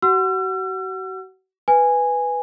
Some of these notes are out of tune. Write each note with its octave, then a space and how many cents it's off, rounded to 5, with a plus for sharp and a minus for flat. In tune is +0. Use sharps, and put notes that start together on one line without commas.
F#4 +35 F#5 +0 E6 +45
B4 +0 G#5 -10